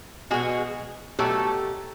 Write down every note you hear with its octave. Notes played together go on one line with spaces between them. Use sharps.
B2 G#3 F#4 G#4
B2 F#3 A3 G4 A4